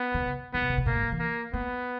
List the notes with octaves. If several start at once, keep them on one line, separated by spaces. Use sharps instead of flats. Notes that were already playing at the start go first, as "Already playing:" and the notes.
Already playing: B3
D#3
C#3
D#3 B3
B2
C#3
B2
A#2 A#3
G#2
C#3
E3
A#3
A#3 B3